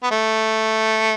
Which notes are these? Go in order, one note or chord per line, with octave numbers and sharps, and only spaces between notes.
B3
A3